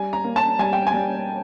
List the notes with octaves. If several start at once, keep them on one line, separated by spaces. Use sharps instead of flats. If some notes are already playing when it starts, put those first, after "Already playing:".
Already playing: G3 G#5
A#5
A#3
A5
G3 G#5
G5
G#5
G3